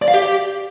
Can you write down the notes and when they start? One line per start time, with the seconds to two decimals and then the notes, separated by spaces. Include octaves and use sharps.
0.02 D5
0.08 F5
0.14 G4